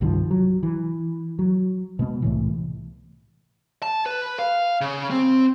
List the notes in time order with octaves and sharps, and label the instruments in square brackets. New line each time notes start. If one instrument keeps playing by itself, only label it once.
[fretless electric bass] C2 G2 D#3 F3
F#3
E3
F#3
B2 G#3 B3
C2 A2 E3
[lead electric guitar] A5
B4
F5
C#3
C4